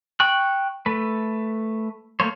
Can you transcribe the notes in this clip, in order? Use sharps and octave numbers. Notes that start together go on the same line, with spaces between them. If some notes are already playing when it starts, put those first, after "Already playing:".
G5 C#6 F#6
A3 B4
A3 A#3 C5 C#5